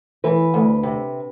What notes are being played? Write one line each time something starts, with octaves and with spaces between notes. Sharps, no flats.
E3 B4
D2
C3